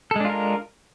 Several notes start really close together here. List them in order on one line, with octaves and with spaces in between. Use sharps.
A4 G#3 D4 F4 A#4